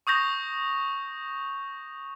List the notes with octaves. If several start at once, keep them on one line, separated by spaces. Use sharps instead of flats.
C#6 D#6 G6 A#6 F7